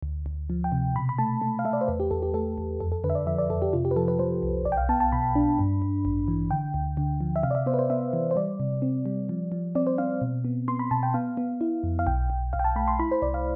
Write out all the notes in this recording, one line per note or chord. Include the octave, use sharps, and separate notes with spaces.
D2
D2
F3
G5
C3
B2 B5
B5
A3 A5
A3
F5
A3 E5
D5
C5
E2 B4
G4
E2 A4
G4
A3 A4
E2
F2 A4
A4
D3 B4
E5
D5
F3 E5
D5
F2 A4
G4
C3 F4
G4
B4
F3 A4
B4
F3 C5
C2
B1 D5
G5
F5
B3 A5
A5
B2 B5
D4
G2
G2
A1
E3
D3 G5
D2
D3
F3
E5
C3 F5
D5
E5
B3 C5
B4
C5
B3 E5
E3
C5
G3 D5
C3
C4
G3
F3
F3
C4 D5
C5
C4 F5
B2
B3
B3 C6
B5
B2 A5
G5
B3 F5
B3
E4
F2
F5
B1 G5
B1
B1 F5
G5
A5
A3 B5
C6
E4 B5
C5
C2 D5
F5